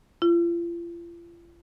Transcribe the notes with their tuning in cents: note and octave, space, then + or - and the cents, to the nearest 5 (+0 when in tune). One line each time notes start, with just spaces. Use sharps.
F4 -40